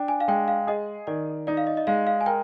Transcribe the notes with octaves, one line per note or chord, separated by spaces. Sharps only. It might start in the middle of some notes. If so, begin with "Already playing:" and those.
Already playing: D4 G5
G#5
F5
G#3 G5
F5
G#4 D#5
D#3 D5
D#4 D5
F5
D#5
D#5
G#3 F5
F5
G#5
A#4 G5